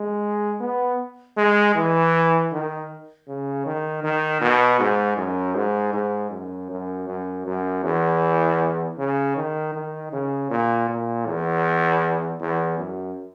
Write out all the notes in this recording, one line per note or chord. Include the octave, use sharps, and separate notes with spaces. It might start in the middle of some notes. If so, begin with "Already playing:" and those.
Already playing: G#3
B3
G#3
E3
D#3
C#3
D#3
D#3
B2
G#2
F#2
G#2
G#2
F#2
F#2
F#2
F#2
E2
C#3
D#3
D#3
C#3
A#2
A#2
E2
E2
F#2